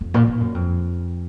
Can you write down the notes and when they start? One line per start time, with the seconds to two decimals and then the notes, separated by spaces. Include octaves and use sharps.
0.01 F2
0.14 A#2
0.28 A#2
0.40 F#2
0.54 F2